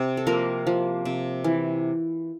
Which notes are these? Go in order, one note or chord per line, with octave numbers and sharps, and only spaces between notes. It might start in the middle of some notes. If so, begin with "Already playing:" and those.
Already playing: C3 C4
A4
F3 A#3 A#4
F3
C3
E3